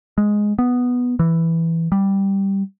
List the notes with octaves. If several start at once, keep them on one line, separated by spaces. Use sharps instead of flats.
G#3
B3
E3
G3